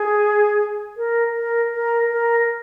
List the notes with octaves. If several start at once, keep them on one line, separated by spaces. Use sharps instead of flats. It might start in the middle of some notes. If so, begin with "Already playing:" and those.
Already playing: G#4
A#4
A#4
A#4
A#4